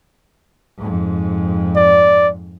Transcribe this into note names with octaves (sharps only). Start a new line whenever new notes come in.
F2 G#2
D5